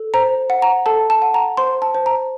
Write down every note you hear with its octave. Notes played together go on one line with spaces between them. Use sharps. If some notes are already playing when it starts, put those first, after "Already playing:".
Already playing: A4
C5 A#5
F#5
A#5
A4 A5
A5
F#5
A#5
C5 C6
A5
C5
A#5